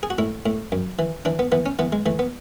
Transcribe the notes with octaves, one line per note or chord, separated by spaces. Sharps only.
G#4
F#4
A2 E4
A2
F#2
E3
E3 D4
B3
E3 B3
C#4
E3 B3
G#3
E3 A3
B3